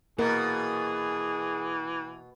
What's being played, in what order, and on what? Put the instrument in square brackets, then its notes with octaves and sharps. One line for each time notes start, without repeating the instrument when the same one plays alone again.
[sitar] B2 [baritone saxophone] E3 [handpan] A#3 A#4 [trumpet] G#4